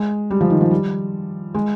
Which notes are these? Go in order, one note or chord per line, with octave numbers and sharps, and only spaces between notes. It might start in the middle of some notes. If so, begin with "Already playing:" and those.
Already playing: G#3
G3
F3
D#3
F3
G3
G#3